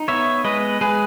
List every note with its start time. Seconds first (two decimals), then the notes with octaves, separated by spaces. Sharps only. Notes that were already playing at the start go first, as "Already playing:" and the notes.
Already playing: D#4
0.08 B3 C#5 E5
0.45 G#3 B4 D#5
0.81 G#3 G#4 B4